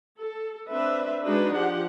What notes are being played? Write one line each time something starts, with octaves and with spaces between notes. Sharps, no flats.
A4
C4 D4 B4 E5
G#3 D4 D#4 F#4 G#4 B4
F3 G4 F#5